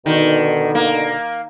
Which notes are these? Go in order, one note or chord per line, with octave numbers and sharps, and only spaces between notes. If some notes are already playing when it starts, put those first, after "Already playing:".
B2 D3 D#3
A#3